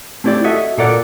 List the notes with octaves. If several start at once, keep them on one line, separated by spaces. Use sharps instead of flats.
A3 C4 E4 G4 D5
F#4 A4 D#5 E5
A#2 F4 A4 A#4 D5 F#5